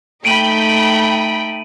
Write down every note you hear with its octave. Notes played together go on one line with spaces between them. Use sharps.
A3 D#4 G5 B5 D7 D#7 F#7